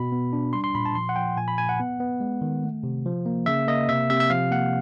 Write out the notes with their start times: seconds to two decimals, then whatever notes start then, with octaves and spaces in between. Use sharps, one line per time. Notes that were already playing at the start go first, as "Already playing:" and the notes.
Already playing: B2 B5
0.12 B3
0.33 D4
0.53 G3 C6
0.64 C6
0.75 A#2 B5
0.85 A5
0.95 F3 C6
1.09 F#5
1.16 F3 G5
1.37 A#2 G#5
1.48 B5
1.58 A#2 G#5
1.69 F#5
1.80 B3
2.00 B3
2.20 G#3
2.41 D#3
2.64 A3
2.83 C3
3.06 F3
3.26 A#3
3.46 C#3 E5
3.67 A#3 D#5
3.89 C3 E5
4.10 C3 E5
4.20 E5
4.30 F3 F5
4.51 A#3 F#5